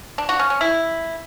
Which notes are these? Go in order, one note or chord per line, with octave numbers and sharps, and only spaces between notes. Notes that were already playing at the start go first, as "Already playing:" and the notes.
D4
F#4
C#4
C#4
E4